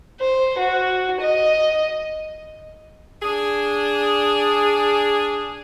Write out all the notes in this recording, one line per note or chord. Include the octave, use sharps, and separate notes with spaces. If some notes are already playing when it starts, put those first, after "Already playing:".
C5
F#4
D#5
D4 G#4